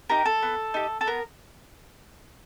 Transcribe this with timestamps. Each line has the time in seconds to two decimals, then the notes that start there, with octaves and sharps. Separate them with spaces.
0.10 D#4 G4 A#4
0.26 A4
0.42 B3
0.74 D#4 G4
1.01 A4
1.07 B3 A#4